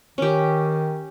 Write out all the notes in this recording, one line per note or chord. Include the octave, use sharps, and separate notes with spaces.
D#3 C#4 G4